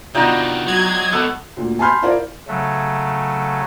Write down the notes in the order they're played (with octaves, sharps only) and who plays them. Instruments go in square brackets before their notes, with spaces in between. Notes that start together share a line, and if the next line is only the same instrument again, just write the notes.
[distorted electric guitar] C3 D#3 [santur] B3 D#4 G5 [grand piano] D4 F4 F#4
[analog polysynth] F#3 G#6 [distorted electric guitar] G#3
[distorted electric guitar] G#2 D3 [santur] A3 B3 F#5
[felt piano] D2 A#2
G#5 A5 B5 C6 F6 G6
E4 F4 A#4 C5 D5 F5
[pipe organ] C#3 F#3 A3